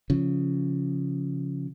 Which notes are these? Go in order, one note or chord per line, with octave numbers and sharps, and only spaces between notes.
C#3 F3